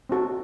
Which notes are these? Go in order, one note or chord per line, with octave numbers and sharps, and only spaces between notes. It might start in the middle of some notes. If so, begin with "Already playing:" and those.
C4 D#4 F#4 A4